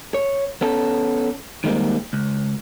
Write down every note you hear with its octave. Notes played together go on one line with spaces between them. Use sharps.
C#5
B3 C#4 A4
D#3 G3 G#3 A#3 C4
C#2